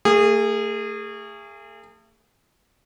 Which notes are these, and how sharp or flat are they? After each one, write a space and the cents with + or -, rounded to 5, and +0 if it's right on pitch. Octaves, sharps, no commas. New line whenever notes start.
A3 +35 G#4 -25